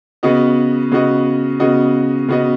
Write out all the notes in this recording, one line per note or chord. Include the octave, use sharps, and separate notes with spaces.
C#3 B3 F#4 D#5
C#3 B3 F#4 D#5
C#3 B3 F#4 D#5
C#3 B3 F#4 D#5